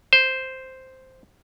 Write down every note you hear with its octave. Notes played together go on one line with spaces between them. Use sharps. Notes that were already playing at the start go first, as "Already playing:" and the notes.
C5